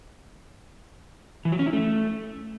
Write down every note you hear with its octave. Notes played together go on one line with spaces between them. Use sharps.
E3
F#3
C#4
E4
A3